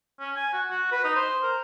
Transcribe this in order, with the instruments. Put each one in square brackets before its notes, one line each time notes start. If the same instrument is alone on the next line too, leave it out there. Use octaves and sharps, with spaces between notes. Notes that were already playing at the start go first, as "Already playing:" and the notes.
[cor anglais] C#4
G#5
F#4
F#4
B4
D#4
C5
A#4